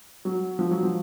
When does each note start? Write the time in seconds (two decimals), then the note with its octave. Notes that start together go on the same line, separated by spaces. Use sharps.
0.25 F#3
0.59 F3
0.71 F#3
0.83 F3